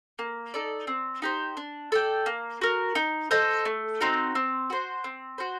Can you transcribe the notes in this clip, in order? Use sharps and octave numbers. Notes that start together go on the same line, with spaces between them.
A#3
D#4 A4 D5
C4
D#4 G4 C5
D4
A4 D5 G5
A#3
F#4 A#4
D#4
A4 C5 D#5
A3
C4 D#4 F#4
C4
F#4 C5
C4
F#4 C5